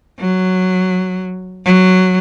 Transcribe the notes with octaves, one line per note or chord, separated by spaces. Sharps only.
F#3
F#3